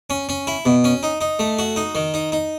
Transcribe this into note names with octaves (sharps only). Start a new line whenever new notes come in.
C#4
C#4
E4
B2
C#4
D#4
D#4
A3
F#4
D#4
D#3
D#4
D#4